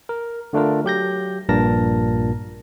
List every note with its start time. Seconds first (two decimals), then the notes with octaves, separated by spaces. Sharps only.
0.09 A#4
0.53 D3 A3 D4 F4 A#4
0.84 F#3 G4 G6 A#6
1.49 A#1 G2 A#2 A#4 A5 A#6